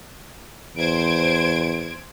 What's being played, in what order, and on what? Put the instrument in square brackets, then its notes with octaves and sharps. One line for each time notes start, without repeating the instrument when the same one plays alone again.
[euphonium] E2 [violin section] C5 G#6 D7